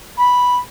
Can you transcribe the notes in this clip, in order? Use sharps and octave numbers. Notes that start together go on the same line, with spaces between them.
B5